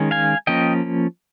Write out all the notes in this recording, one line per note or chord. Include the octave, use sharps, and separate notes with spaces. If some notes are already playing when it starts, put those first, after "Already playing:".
Already playing: D#3 G#3 C#4
F5 G#5
F3 A#3 C#4 D#5 G5